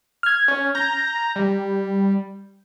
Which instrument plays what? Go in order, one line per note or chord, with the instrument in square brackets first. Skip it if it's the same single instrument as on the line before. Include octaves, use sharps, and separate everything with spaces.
[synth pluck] F6 G#6
[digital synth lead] C#4
[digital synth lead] A#5 [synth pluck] G6
[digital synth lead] G3